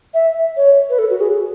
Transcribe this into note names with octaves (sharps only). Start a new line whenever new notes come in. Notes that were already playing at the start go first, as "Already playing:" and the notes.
E5
C#5
B4
A4
F#4
G#4